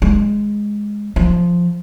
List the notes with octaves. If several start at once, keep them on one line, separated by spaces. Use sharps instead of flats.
G#3
F3